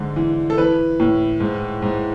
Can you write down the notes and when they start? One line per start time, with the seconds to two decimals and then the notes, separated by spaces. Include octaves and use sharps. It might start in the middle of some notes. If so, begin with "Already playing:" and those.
Already playing: G#2 D3
0.16 E3
0.50 A4
0.58 E3 B4
1.00 A2
1.40 G#2
1.82 G#2